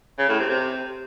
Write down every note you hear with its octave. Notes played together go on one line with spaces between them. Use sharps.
C#3
A2
C3
C3